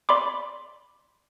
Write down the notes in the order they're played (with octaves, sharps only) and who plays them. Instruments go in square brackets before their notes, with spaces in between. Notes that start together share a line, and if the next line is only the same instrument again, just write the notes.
[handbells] D5 B5 C6 D6